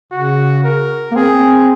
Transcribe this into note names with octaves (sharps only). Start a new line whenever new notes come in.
C#3 F#4
A#4
A#3
C4 G#4